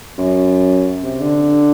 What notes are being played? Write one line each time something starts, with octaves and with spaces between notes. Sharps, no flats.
F#2
C3
D3